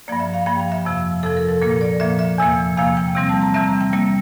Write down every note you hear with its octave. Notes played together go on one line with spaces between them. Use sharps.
G2 F3 A#3 D5
E5
F5
G2 F3 A#3 G5
F5
E5
F2 C3 F3
F2 C3 F3 A4
A#4
A4
A#2 F3 A#3 A#4
D5
A#2 F3 A#3 E5
E5
E2 C3 F3 A#3
E2 C3 F3 A#3 F5
G5
C3 E3 G3 C4
A5
A#5
C3 E3 G3 C4 E5
A#5
G5
C3 G3 A#3 G5